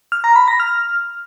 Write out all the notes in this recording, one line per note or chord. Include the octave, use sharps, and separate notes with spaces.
F6
A#5
B5
A#6
F6